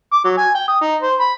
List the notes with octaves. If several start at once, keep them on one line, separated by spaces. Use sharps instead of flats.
D6
F#3
G#5
G5
D#6
D#4
C5
B5